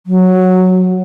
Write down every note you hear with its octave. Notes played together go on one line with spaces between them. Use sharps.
F#3